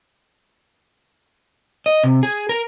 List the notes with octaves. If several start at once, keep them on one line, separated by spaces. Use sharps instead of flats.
D#5
C3
G#4
A#4